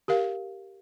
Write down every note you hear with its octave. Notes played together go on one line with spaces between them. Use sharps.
G4 A#4 F5